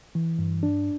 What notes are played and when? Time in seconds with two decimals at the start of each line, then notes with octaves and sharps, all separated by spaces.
0.15 E3
0.39 G2
0.63 D4